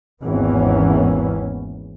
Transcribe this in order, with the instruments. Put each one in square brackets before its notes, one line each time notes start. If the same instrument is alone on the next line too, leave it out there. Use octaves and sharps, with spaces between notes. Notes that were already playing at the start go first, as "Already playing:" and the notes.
[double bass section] G#1 E2 E3 A#3 B3 C#4